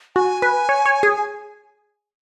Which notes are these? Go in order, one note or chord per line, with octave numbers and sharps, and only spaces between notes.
F#4 G#5
B4
C#5
C#5
G#4